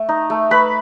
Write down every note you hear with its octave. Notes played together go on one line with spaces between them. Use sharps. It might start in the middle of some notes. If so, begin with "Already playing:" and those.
Already playing: A3
D#4
A3
A3 B4 B5